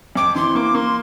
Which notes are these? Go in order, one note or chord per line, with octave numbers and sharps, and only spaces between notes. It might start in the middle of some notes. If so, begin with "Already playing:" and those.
F2 D6
E3 C6
A#3 D6
A#3 C6